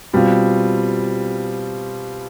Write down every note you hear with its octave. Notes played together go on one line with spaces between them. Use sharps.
B2 G3 C4 F4